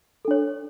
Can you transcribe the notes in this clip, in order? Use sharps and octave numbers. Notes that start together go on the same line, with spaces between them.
D4 A4 C#5